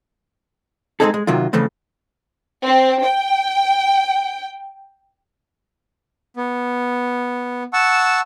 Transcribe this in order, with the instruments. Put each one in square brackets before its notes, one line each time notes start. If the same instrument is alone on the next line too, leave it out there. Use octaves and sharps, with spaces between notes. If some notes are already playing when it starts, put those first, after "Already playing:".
[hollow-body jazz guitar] G#3 A3 C4 D#4 G#4 A4
G#3
C3 D#3 F#3 F4
C#3 E3 F3 A3 C4
[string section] C4
G5
[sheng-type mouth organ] B3
F#5 A5 C#6 E6